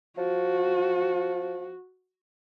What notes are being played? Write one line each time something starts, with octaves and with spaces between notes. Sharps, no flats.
F3 F#4